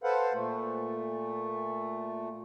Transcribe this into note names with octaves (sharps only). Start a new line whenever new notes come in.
A4 B4 C5 F5 F#5
A#2 A3